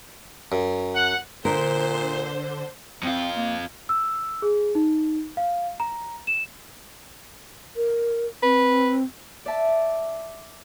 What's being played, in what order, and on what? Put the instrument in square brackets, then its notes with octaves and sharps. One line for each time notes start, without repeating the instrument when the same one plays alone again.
[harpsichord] F#2
[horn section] F#5
[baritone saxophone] A#2 [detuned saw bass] D3 [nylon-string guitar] A#4 [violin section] C5
[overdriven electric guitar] F2 F4 [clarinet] C4
[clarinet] A#3
[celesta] E6
G#4
D#4
F5
A#5
E7
[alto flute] A#4
[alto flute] C4 [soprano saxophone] B4
[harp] D5 E5 A5